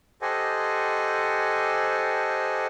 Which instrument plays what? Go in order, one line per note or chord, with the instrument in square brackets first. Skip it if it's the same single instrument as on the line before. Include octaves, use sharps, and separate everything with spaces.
[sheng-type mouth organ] G4 A4 C5 D#5 F#5 G#5